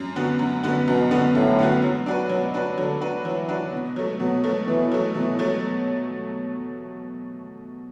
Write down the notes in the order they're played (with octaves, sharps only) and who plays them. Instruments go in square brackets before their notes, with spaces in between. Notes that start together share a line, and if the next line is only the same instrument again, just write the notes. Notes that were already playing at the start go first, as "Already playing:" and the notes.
Already playing: [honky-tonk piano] F#2
D3 B3 F#4
F#2
D3 B3 F#4
[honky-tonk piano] F#2 [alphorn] B2
[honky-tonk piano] D3 B3 F#4
[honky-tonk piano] F#2 [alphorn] A2
[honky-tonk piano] D3 B3 F#4
F#3
D4 F#4 B4
[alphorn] B2 [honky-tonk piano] F#3
[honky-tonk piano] D4 F#4 B4
[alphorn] D3 [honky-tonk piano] F#3
[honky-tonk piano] D4 F#4 B4
[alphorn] E3 [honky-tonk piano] F#3
[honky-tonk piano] D4 F#4 B4
B2
F#3 A3
[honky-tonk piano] B2 [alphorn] F#3
[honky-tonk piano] F#3 A3
[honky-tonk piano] B2 [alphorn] E3
[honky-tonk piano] F#3 A3
[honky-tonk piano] B2 [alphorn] E3
[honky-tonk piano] F#3 A3